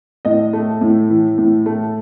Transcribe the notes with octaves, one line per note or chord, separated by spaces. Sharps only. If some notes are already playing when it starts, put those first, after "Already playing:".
A2 D#5
A3
A2
E3
A2
A3